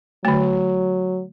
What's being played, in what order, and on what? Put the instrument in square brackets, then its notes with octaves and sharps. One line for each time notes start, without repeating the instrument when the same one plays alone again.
[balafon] D3 A3 [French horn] F#3